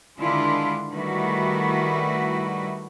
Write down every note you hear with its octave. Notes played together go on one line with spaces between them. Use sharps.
D3 D#3 G#3 D4 E4 F4
D#3 G3 A3 E4 F#4 B4